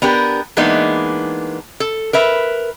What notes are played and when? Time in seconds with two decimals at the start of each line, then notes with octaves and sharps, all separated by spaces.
0.02 B3 D4 G4 A#4
0.57 E3 G#3 A#3 B3 D4 D#4
1.80 A4
2.13 A#4 B4 E5